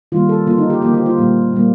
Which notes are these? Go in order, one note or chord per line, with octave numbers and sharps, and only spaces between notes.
D#3 G3 A#3 F4
A4
D3 F3 A#3 F4
D#4
G4
D3 F3 A#3 G4
G4
F4
A#2 G3 A#3
A#2 G3 A#3